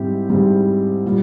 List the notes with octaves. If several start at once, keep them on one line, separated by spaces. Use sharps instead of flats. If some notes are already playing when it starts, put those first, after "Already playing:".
Already playing: G#2 G3 C4 E4 G4
G#2 G3 C4 E4 G4
A#2 G3